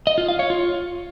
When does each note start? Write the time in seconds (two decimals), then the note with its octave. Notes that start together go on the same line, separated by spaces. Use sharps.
0.07 D#5
0.18 F4
0.28 F5
0.39 C#5
0.50 F4